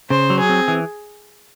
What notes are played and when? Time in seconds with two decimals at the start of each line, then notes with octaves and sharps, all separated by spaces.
0.10 C#3 C5
0.30 F#3
0.39 G#4
0.49 C4
0.68 E3